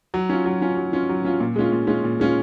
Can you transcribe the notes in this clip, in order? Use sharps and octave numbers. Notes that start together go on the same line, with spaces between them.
F#3
C#4 F4
F#3
C#4 F4
F#3
C#4 F4
F#3
C#4 F4
A#2
G#3 C#4 F4
A#2
G#3 C#4 F4
A#2
G#3 C#4 F4